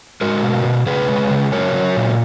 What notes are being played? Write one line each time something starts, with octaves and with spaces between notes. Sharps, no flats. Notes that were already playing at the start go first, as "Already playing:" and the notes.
G#3 F#4 A#4
B2
B2
C#3 G#4 B4
G#3
C#3
F#3 A#4 C#5
F#3
A#2